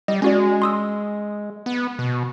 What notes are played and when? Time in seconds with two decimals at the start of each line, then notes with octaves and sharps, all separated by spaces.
0.08 G3 D#5
0.22 G#3 C#4 F#4 D5
0.62 C6 D#6 E6
1.66 B3
1.99 B2